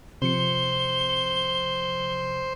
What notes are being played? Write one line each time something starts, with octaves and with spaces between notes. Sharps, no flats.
C3 F3 C5 C#7 G7